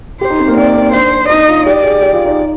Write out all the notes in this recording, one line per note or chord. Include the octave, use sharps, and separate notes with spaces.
G4 C5
D#4
C4
A#3
C4 D5
C4
D4 C5
D#4 D#5
F4
G4 D5
G#4
G4
F4
D#4